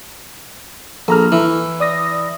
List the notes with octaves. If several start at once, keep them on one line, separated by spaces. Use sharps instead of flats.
A#1 A4 A#5 F6
E3 E4
D5 D#6 A#6